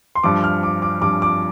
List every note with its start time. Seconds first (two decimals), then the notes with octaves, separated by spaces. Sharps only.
0.15 C6
0.24 G2 F3 D6
0.44 F6
0.63 D6
0.82 D6
1.01 G2 F3 D6
1.22 D6